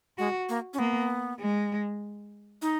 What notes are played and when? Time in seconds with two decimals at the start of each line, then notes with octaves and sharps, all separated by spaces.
0.18 G#3 F#4
0.49 A#3
0.73 C#4
0.78 A#3 B3
1.39 G#3
2.62 D#4